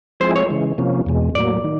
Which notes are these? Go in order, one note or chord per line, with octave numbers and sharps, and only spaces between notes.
F3 G#3 C4 E4 G#4 C5
C#5
C#3 E3 G#3
C3 F3 A#3 C#4
E2 B2 G#3
A2 F#3 A#3 D5
D#3